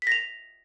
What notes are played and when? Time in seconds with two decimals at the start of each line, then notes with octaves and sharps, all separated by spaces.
0.02 B6
0.07 A#6
0.12 F7